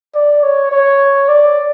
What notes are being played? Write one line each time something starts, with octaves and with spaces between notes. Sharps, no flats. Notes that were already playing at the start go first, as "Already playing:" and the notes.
D5
C#5
C#5
D5